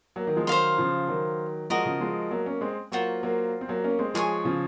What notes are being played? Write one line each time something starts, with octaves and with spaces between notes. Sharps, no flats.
F#3 A#3
D#3 F#3
F3 G#3
D#3 F#3 C5 F5 C6
C#3 F3
D#3 F#3
F3 G#3 F#4 A#4 D#5
C#3 F3
F3 G#3
F#3 A#3
A#3 C#4
G#3 C4
F#3 A#3 F4 C5 F#5 C#6
F#3 A#3
C4
F#3 A#3
A#3 C#4
G#3 C4
F3 G#3 G#4 C#5 G#5 C#6
C#3 F3